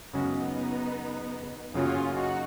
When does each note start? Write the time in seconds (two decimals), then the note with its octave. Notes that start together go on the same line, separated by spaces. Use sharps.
0.14 F#2 C#3 G#3 B3 C#4 D#4 F#4
1.74 F#2 C#3 F#3 A#3 C#4 F4
2.14 D#4 F#4